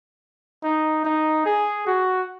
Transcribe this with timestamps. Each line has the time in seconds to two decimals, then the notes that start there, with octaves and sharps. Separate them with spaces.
0.63 D#4
1.05 D#4
1.46 G#4
1.87 F#4